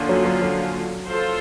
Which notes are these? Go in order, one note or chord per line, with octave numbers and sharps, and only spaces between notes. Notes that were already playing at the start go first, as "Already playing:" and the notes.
Already playing: D3 F3 A#3 C#4 F4
F#3
F#3
F#3
F4 A4 C5